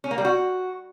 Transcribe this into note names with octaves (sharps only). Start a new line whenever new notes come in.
C#4
A#3
G3
F#4